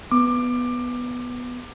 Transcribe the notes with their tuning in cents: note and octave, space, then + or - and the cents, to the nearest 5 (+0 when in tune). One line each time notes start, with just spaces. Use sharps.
B3 +0 D6 +20